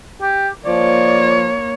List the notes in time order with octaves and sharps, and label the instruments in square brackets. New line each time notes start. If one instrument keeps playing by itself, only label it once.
[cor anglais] G4
[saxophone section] F3 [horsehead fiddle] A#3 C#5 [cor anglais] D5